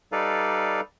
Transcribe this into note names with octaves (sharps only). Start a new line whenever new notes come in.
G3 D#4 A4 B4 D5 F5